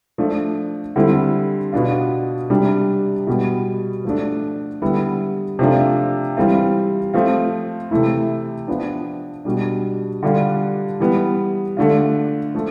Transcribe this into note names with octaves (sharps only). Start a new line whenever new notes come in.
F3 A3 D4
D3 G3 C4 E4
B2 B3 D4 F4
C3 G3 D4
B2 G3 B3
F3 A3 D4
D3 G3 B3 E4
C3 F3 A3 D4 F4
E3 G3 C4 F4
F3 A3 C4 F4
C3 E3 A3 E4
F3 B3 D4
B2 G3 D4
D3 G3 D4 F4
E3 G3 B3
D3 A3 D4 F4
F3 A3